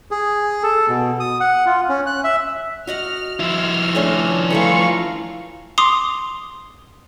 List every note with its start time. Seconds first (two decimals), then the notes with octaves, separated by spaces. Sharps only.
0.11 G#4
0.63 A4
0.89 B2
1.20 D#6
1.40 F#5
1.66 F4
1.89 C#4
2.06 F#6
2.24 E5
2.87 F#4 D#5 F#5 F6
3.40 F3 E4 F6
3.95 A3 C#4 D4
4.50 E3 A3 F4 A#4 F5 C#6
5.78 C6 D6 D#6 C7 F7